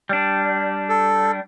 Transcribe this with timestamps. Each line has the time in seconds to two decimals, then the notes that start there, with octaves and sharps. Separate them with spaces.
0.09 G3 D4
0.89 A4